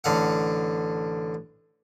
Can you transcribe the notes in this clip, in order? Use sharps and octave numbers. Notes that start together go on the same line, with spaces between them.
A1 D3 F5 F#5